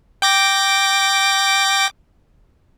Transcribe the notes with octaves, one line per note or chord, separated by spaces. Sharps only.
G5 D6 A#6